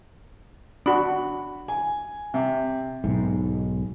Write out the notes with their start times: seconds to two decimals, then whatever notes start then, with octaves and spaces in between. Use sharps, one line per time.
0.86 D4 F#4 B5
1.68 G#5
2.34 C3
3.04 B1 G#2